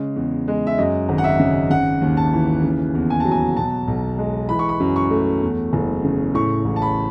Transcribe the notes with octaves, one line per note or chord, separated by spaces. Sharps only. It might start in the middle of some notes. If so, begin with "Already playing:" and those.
Already playing: C#3 G#3
E2
G#3
E5
F#2 D#5
G#1
F#5
E5
C#3
C#3 F#5
D#2
A5
E3
C#3
E2
G#5
F#3 A5
G#5
B2 A5
B1
G#3
E3 B5
C#6
B5
F#2
C#6
A3
E2
F#1
C#3
A2 C#6
A1
A5
B5